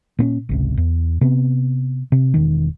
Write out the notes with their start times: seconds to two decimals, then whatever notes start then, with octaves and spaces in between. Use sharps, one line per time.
0.19 A#2 C4 C#4
0.49 G#1 C#2 C3
0.77 E2
1.21 C3 B3
2.12 C3
2.34 E1 D#3